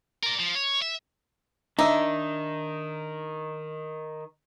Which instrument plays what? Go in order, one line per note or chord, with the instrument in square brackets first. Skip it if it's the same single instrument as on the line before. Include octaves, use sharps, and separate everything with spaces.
[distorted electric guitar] A#4 D5
F3
C#5
E5
[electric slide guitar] D#3 [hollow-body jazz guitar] D4 E5 [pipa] D#4